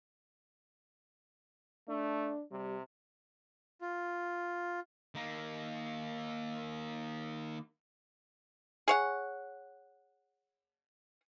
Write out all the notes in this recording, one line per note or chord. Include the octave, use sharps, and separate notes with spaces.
A3 D4
C3 G3
F4
D#3 A#3
G#4 C#5 F#5